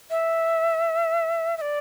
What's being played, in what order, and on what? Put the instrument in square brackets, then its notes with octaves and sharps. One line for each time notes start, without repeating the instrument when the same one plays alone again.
[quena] E5
E5
D5